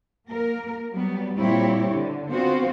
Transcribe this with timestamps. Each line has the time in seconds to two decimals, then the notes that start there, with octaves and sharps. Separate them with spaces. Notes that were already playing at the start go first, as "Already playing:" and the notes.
0.28 A#3 A#4
0.91 F#3 G3 B3
1.38 A#2 G3 C4 E4 G4 C#5
1.92 D3
2.31 B3 C4 F4 F#4 C5